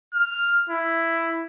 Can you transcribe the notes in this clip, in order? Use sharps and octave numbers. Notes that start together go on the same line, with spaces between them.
F6
E4